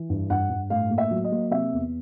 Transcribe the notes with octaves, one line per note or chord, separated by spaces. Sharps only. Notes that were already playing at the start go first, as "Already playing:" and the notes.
Already playing: E3
G2
G2 F#5
G2
A2 F5
A#3
E5
F#3
D#5
A#3
C3 E5
E2